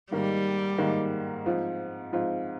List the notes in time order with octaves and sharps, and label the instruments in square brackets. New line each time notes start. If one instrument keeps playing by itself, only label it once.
[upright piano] G#2 D#3 A#3 [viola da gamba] G3
[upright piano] G#2 D#3 A#3
G#2 F3 C4 F4
G#2 F3 C4 F4